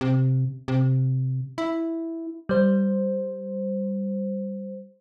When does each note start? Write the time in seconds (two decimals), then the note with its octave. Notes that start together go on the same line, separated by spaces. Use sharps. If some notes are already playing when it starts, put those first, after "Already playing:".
0.01 C3
0.68 C3
1.58 E4
2.49 G3 C5